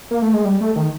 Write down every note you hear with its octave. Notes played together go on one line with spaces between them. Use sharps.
A#3
A3
G#3
G3
A3
D#3